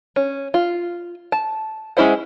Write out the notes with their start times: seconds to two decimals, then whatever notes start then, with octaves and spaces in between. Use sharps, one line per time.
0.16 C#4
0.54 F4
1.32 A5
1.97 G#3 C#4 E4 C5 F#5